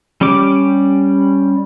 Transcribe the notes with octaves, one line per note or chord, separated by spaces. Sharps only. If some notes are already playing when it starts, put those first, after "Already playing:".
G3 C#4 G4 D6